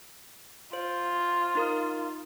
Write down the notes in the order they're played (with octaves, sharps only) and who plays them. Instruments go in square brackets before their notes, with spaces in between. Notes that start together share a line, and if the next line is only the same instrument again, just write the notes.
[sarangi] F4 [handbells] C5
[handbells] D#4 A#4 D#6